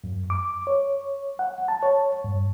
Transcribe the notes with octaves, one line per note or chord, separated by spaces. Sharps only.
F#2
D6
C#5
F#5
A5
C#5
G2